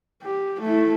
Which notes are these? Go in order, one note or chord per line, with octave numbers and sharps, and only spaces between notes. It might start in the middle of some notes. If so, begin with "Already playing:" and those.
G4
A3 E4